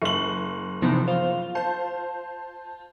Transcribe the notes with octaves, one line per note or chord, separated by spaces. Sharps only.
F#1 F#7
C3 E3 F3 B3 C4 D#4
F4 C5
C5 A5 G6